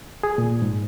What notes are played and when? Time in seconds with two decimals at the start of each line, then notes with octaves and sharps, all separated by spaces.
0.23 G#4
0.38 A#2
0.62 G#2